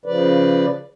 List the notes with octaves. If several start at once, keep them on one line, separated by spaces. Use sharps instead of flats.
C#3 F3 B4 D5